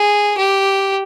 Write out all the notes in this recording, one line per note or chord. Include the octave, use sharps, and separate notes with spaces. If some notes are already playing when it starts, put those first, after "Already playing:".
Already playing: G#4
G4